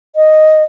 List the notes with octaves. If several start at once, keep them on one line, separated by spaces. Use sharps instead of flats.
D#5